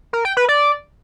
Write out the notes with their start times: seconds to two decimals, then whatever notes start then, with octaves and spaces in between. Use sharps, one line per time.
0.13 A#4
0.25 G5
0.37 B4
0.48 D5